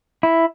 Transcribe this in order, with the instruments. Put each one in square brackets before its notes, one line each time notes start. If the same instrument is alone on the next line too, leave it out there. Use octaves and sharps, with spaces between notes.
[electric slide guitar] E4